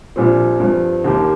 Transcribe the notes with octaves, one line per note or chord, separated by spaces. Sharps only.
A#1 A#2 G3 C4
G2 F3 C4
D#2 D#3 A#3 G4 A#4